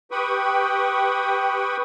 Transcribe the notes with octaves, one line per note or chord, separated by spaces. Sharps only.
G4 B4 G5 B5 C#6 D#6